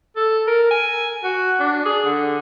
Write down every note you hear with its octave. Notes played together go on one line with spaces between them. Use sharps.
A4
A#4
G#5
F#4
D4
G#4
D3